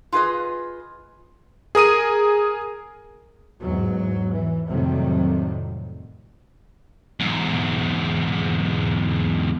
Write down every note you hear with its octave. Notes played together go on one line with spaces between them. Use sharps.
F4 G#4 B4 D#5
G#4 A#4 D#6 D#7
E2 G#2 F#3
E3
F2 A2 C3 D#3 F#3 G3
E2 G#2